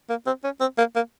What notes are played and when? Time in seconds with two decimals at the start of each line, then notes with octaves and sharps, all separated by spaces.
0.10 A#3
0.26 C4
0.44 C#4
0.60 C4
0.78 A#3
0.96 A#3